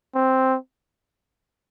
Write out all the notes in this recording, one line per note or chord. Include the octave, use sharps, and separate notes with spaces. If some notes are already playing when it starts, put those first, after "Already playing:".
C4